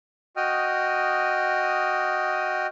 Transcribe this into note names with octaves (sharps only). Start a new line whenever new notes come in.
F#4 D#5 G5 D#6 F6